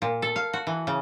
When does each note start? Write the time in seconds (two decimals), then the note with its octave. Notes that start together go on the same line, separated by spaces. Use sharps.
0.02 A#2
0.22 A4
0.36 F5
0.53 F#4
0.67 E3
0.87 C#3